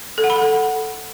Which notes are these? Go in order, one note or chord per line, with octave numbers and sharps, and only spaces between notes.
A4
F#5
B5
F#5
A4